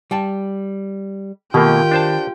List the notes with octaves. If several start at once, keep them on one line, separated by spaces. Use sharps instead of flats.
G3 G5 A5
B2 D#3 A3 A#3 F4 G4 A#4 G5
D4 C5 A5